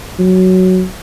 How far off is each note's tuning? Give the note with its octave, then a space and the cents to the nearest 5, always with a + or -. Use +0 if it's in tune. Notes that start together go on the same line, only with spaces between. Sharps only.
F#3 +5